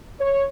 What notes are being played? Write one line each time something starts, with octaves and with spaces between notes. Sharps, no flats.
C#5